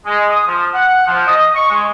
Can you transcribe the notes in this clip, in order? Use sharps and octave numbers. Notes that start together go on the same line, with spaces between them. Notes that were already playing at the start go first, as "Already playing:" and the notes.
G#3
D#6
F3
F#5
F3
D#5
C#6
G#3